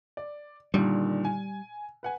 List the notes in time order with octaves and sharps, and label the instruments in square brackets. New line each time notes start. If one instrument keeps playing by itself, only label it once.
[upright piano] D5
[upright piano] A#2 D3 D#3 [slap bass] G3
[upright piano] G#5
B4 F#5 G#5